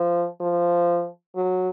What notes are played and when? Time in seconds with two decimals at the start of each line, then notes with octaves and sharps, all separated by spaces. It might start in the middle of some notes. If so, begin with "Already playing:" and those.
Already playing: F3
0.41 F3
1.36 F#3